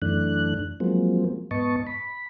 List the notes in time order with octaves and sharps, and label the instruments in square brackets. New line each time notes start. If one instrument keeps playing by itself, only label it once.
[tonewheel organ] F#2 E3 A3 D4 F#6
F3 F#3 G#3 A#3 C4
G#2 B3 D#5 A5 C#6
B5